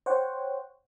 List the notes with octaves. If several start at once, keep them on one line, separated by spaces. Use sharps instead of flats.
C5 C#5 F#5 G5